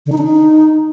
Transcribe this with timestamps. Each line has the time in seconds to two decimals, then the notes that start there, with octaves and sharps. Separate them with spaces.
0.06 D3
0.12 D#4
0.18 D4
0.24 D#4